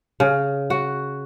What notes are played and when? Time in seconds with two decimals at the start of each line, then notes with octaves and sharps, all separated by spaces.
0.20 C#3
0.70 F#4